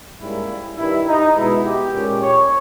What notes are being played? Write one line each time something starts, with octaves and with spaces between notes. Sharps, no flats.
G#2 G3 A#3 C#4 E4
G2 D#3 G3 E4
D#4
B2 G#3 B3 E4
G4
A#2 G#3 C#4
C#5